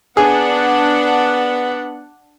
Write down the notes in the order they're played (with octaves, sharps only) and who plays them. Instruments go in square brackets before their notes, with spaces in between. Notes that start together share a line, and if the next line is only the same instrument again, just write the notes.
[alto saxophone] B3 [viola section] D4 F#5 [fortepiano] G#4